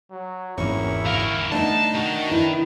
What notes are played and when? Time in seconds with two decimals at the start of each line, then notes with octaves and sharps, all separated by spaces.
0.11 F#3
0.57 G#1 E2 A#3 C#4 E4 C#6
1.05 D2 A#4 F5
1.52 A3 B3 D4 D#4 A5
1.94 D#3 F#4
2.31 E4 B4